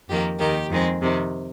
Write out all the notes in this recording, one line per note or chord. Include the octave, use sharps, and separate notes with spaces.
F2 D#3 A#3 G4
D#2 D#3 A#3 G4
F2 D#3 G#3 C4
F2 C3 D#3